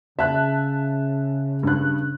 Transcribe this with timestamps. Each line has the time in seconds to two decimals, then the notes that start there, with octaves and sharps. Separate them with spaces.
0.19 C#3 E5 A5 F#6
1.63 G2 F#6